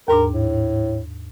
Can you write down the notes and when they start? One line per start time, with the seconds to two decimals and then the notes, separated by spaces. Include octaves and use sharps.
0.08 D#2 G#2 D4 A#4
0.33 A2